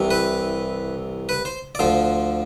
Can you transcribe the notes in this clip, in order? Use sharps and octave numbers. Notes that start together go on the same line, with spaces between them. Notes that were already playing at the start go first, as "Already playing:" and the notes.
Already playing: C2 C3 E3
B4
B4
C5
D5
D2 D3 F3 C5